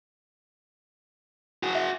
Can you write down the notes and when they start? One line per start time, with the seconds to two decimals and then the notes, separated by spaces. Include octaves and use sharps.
1.63 F#4 G#4
1.75 E5